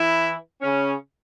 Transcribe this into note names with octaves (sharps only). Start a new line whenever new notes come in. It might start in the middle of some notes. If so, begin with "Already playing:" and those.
Already playing: E3 E4
C#3 C#4